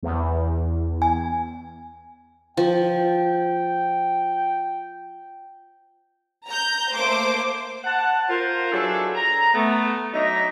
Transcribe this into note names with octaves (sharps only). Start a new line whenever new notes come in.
E2
G#5
F3 G5
A#5 G6
A3 A#3 C5 D6
F#5 A5
F4 A#4 C5
F#3 D4 E4 G#4 A4
A#5
A3 B3
F#3 D4 D#4 D#5 E5 A#5